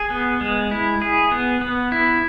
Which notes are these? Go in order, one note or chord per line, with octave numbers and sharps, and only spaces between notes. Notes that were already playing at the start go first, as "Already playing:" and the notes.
Already playing: G#4
B3
G#3
E4
G#4
B3
B3
E4